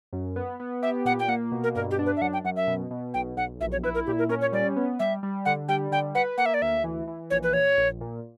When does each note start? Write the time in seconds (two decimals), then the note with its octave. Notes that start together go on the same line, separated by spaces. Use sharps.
0.13 F#2
0.36 B3
0.60 B3
0.82 G4 E5
1.05 A#2 F#5
1.20 G5
1.28 A#3 F#5
1.52 B2
1.64 A#4
1.75 G2 A#4
1.91 G4
1.99 D4
2.06 B4
2.17 E5
2.21 F#2 F#5
2.33 G5
2.45 F#2 F#5
2.56 E5
2.67 B2
2.91 B2
3.14 B1 G5
3.37 B1 F#5
3.61 A#1 E5
3.72 C#5
3.83 E4 B4
3.95 A#4
4.06 A#2 G4
4.19 A#4
4.29 C#4 A#4
4.41 C#5
4.52 G3 D5
4.76 B3
4.99 G3 E5
5.23 G3
5.45 D3 F#5
5.69 G3 G5
5.91 D3 G5
6.15 B4 F#5
6.38 A#3 F#5
6.46 E5
6.54 D5
6.62 D2 E5
6.84 E3
7.07 E3
7.30 A#1 C#5
7.43 B4
7.53 A#2 C#5
7.77 A#1
8.01 A#2